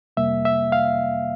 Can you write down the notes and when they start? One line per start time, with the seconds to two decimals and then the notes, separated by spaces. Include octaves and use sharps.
0.17 F2 C3 G3 A#3 E5
0.45 E5
0.72 F5